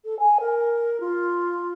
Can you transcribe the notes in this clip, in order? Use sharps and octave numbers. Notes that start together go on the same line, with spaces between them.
A4
G#5
A#4
F4